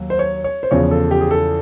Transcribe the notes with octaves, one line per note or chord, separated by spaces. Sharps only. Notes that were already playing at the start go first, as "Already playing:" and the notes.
Already playing: D#2 F#3
C5
C#5
C#5
C5
E2 C#3 F3 C#5
A4
G4
G#4
A4